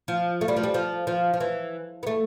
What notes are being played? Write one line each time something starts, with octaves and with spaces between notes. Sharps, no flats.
F3
A3
G3
F3
G3
F3
F3
F3
E3
B3
A3